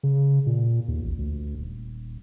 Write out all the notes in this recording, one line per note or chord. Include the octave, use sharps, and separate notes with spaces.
C#3
A#2
D#2
A1
D2
D#1